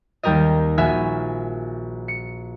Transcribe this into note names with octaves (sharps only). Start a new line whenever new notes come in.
D#2 G3 G4 A#4 D#5
A#1 F#4 E5 G#5 F6
C#7